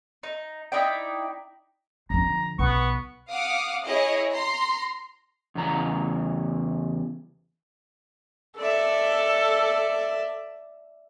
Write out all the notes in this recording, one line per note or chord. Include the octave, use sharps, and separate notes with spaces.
D#4
D#4 E4 D5 G5
F2 D3 A#5
B1 B3 C#6
F5 F#5 D6 D#6
E4 G#4 C#5 D#5
A#5 C6
E2 C#3 A#5
A4 D5 E5